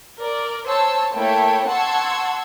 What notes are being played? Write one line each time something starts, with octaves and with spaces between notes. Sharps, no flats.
A#4 D5
C5 C#5 A5 C6 E6
A3 A#3 E4 C#5 G5 A5
F#5 A5 C6 C#6 E6 G#6